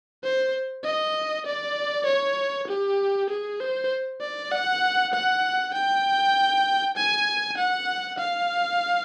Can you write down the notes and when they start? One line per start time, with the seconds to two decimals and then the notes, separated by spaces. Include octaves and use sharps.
0.24 C5
0.84 D#5
1.46 D5
2.06 C#5
2.68 G4
3.30 G#4
3.61 C5
4.21 D5
4.52 F#5
5.14 F#5
5.74 G5
6.96 G#5
7.58 F#5
8.18 F5